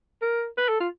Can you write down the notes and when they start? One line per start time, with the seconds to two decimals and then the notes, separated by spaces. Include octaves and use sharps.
0.22 A#4
0.57 B4
0.68 A4
0.80 F4